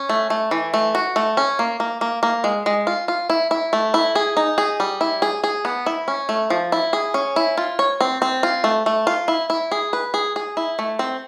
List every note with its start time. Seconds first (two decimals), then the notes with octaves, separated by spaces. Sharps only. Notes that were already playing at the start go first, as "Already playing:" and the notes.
Already playing: C#4
0.09 A3
0.30 A3
0.51 E3
0.74 A3
0.95 F#4
1.16 A3
1.37 C#4
1.59 A#3
1.80 A#3
2.01 A#3
2.23 A#3
2.44 G#3
2.66 G#3
2.87 F4
3.08 F4
3.30 E4
3.51 E4
3.73 A3
3.94 E4
4.15 G#4
4.37 D#4
4.58 G#4
4.80 G3
5.01 E4
5.22 G#4
5.44 G#4
5.65 B3
5.86 E4
6.08 C#4
6.29 A3
6.50 F3
6.72 E4
6.93 G#4
7.14 C#4
7.36 E4
7.58 F4
7.79 C#5
8.01 C4
8.22 C4
8.43 F4
8.64 A3
8.86 A3
9.07 F4
9.28 E4
9.50 E4
9.72 G#4
9.93 B4
10.14 G#4
10.36 G#4
10.57 E4
10.79 A3
10.99 C4